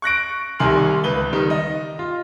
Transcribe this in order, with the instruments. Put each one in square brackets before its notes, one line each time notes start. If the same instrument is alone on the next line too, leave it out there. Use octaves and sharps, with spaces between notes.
[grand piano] C#6 F#6 A#6 D7
C2 D#3 G#5 C6 F6 F#7
C#2 B4 G7
D#3 G3
D#5
F4